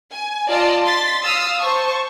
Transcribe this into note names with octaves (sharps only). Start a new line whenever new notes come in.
G#5
F4 D5 D#5 A5
C6 A6 B6
F5 D#6 E6
C5 A5 C#6